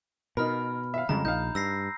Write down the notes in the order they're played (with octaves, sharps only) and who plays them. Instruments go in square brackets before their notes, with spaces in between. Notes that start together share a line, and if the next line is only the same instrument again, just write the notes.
[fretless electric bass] B2 [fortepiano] D#4 A#4 [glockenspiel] B5 F6
[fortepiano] E5 F5
[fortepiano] F2 [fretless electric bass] C#3 G3 G#3 [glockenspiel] A#5
[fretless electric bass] A#1 [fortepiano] D#4 F5 [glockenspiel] G6
[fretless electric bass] G2 [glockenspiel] E6 A#6 C7